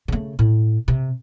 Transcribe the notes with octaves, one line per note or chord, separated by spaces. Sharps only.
C#3 A3
A2
C3